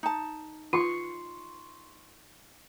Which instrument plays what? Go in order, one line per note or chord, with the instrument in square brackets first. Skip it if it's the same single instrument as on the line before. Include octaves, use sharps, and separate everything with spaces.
[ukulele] D#4 A5
[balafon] F4 [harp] C6 C#6